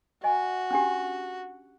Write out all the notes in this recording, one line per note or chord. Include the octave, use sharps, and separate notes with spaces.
F#4 D#5 G#5
C#4 D4 G4